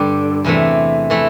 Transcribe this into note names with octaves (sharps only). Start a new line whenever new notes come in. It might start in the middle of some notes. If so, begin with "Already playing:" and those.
Already playing: G2 D3 G3 D4
E2 C3 E3 A3
E3 A3 E4